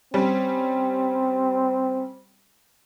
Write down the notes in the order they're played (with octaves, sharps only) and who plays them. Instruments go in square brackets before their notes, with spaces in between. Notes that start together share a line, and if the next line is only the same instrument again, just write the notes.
[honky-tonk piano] G3 C#4 [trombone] C4